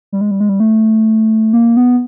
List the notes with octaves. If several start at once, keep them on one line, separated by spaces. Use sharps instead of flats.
G3
G#3
G3
G#3
G3
A3
A#3
B3